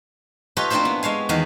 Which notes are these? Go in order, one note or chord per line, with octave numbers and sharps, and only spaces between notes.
F4 G4 A4 B4 C#5 D#5
A#3 C4 D4 E4 A4 C5
B3
G#3 C#5 F5 G#5
E2 D#3 F#4 G#4 B4 F5